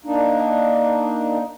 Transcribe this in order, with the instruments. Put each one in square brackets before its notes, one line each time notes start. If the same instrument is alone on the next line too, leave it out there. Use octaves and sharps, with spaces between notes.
[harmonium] A#3 D4 D#4